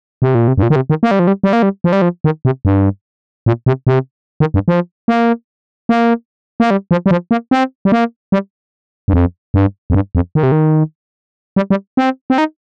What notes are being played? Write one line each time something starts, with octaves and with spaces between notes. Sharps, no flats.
C3
A#2
C3
G2
A#2
D#3
C3
D#3
A#3
G3
F3
G3
G3
A#3
G3
F3
G3
F3
D#3
C3
G2
A#2
C3
C3
D#3
G2
F3
A#3
A#3
A#3
G3
F3
G3
F3
A#3
C4
G3
A#3
G3
G2
F2
G2
F2
G2
F2
D#3
C3
D#3
G3
G3
C4
C4
D#4